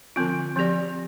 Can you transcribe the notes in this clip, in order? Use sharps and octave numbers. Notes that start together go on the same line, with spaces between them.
D3 F3 C4 F4
F3 C4 G4 D5